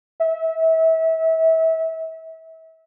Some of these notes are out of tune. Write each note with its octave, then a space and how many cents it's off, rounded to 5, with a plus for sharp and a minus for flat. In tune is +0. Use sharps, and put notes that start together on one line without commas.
E5 -35